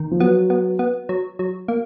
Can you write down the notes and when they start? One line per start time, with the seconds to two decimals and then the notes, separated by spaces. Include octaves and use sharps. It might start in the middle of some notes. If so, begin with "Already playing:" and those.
Already playing: D#3
0.11 F3
0.20 F#3 B3
0.50 B3
0.79 B3
1.09 F#3
1.39 F#3
1.68 A#3